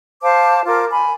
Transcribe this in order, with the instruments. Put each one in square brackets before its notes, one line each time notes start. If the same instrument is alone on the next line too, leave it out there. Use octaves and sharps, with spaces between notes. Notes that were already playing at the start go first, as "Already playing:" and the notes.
[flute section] C5 F5 A5 D6
F4 A#4 D6
G#5 B5